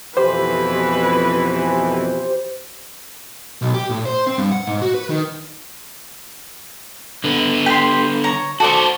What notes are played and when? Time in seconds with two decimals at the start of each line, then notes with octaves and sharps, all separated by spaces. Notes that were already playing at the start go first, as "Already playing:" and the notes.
0.17 F2 B2 E3 G4 B4 C5
3.62 B1
3.74 G4
3.90 A2
4.06 C5
4.27 C4
4.38 G2
4.52 F#5
4.67 G#2
4.82 F#4
4.94 B4
5.10 D#3
7.24 D3 B3
7.66 G4 C6
8.24 C#5 A#5
8.60 F#4 A4 C5 D5 C#6